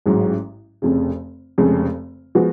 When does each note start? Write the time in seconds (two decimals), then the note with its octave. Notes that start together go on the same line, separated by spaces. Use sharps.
0.06 A1 G#2 F#3
0.82 F1 F2 C#3
1.58 F1 F2 C#3 G#3
2.35 F3 G#3 B3 F#4